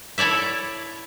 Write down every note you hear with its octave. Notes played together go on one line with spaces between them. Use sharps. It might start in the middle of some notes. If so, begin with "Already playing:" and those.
E4 A4 C#5 D5 E5